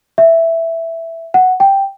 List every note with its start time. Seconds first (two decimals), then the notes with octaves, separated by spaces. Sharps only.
0.18 E5
1.34 F#5
1.60 G5